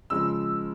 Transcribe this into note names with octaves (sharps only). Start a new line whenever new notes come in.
C#3 F3 G#3 E6